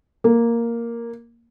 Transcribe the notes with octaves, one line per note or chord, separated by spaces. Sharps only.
A#3